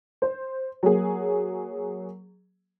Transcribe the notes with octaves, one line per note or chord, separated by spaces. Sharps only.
C5
F#3 A#3 G#4